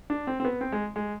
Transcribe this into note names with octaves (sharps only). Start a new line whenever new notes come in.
D4
C4
C4
B3
C4
G#3
G#3